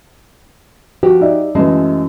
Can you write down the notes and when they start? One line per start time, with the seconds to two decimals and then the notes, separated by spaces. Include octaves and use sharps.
1.03 F3 F#4 G4
1.21 D#4 D5 E5
1.55 F#2 E3 G#3 A3 A5